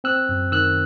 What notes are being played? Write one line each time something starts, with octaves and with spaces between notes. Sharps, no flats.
C4 E6 F#6
F#2
D#3 E6 F#6